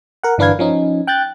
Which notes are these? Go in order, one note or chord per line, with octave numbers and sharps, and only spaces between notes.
A#4 F#5
G1 E3 D4 B4 F5 G#6
F3 C#4 D#4
G5 F#6 G6 A6